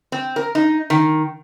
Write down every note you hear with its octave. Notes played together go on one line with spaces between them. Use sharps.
C4
A#4
D#4
D#3